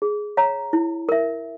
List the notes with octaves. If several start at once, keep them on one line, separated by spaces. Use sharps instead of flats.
G#4
C#5 F5 A#5
E4
A#4 E5